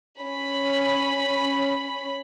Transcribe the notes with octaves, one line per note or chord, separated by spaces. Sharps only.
C#4 B5